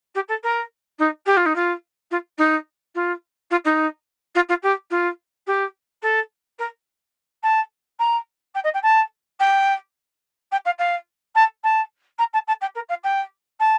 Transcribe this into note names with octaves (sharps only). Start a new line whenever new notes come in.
G4
A4
A#4
D#4
G4
F4
D#4
F4
F4
D#4
F4
F4
D#4
F4
F4
G4
F4
G4
A4
A#4
A5
A#5
G5
D#5
G5
A5
G5
G5
F5
F5
A5
A5
A#5
A5
A5
G5
A#4
F5
G5
A5